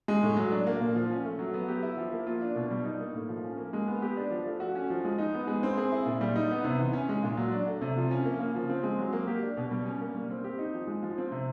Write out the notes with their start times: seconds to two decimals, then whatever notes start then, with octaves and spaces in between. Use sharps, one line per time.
0.08 G#3
0.23 A2
0.37 F#3
0.52 D4
0.67 A#3
0.80 A#2
0.95 F3
1.10 C#4
1.25 A3
1.39 F#3
1.54 B3
1.68 G4
1.83 E4
1.98 F3
2.13 A#3
2.27 F4
2.42 D4
2.55 B2
2.71 G3
2.84 D#4
3.00 A#3
3.14 A2
3.29 F3
3.44 C#4
3.58 A#3
3.73 G#3
3.88 B3
4.02 G4
4.17 D4
4.31 F3
4.46 A3
4.60 F#4
4.75 C#4
4.90 F3
5.05 G#3
5.18 D#4
5.34 B3
5.47 G#3
5.63 C4
5.77 G#4
5.92 E4
6.06 A#2
6.21 G3
6.36 D#4
6.51 B3
6.64 C3
6.79 E3
6.93 C#4
7.09 G#3
7.23 A#2
7.37 F#3
7.52 D4
7.67 A3
7.81 C3
7.97 F3
8.11 C#4
8.25 A#3
8.39 C#3
8.55 F3
8.70 C4
8.83 G#3
8.99 F#3
9.13 A#3
9.27 G4
9.43 D4
9.57 B2
9.71 G3
9.85 C#4
10.01 A#3
10.15 G3
10.30 C4
10.44 G4
10.58 D#4
10.74 F3
10.88 G#3
11.02 F3
11.18 C4
11.32 C3